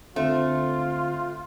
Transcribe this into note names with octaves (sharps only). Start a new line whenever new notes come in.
D2 A3 C4 F4